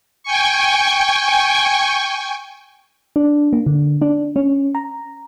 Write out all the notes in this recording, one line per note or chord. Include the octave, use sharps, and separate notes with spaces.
G5 G#5 C#6
D4
A#3
D3
D4
C#4
A#5